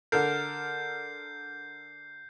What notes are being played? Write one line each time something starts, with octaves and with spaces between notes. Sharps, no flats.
D3 A4 A#4 G6 C7